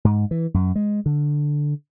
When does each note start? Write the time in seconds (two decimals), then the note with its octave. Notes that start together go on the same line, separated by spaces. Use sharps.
0.05 G#2
0.31 E3
0.54 F#2
0.76 G#3
1.06 D3